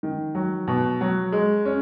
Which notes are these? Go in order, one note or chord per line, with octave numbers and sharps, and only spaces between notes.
D#3
F#3
B2
F#3
G#3
C#4